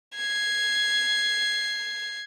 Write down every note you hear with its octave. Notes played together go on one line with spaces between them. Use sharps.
G#6 C7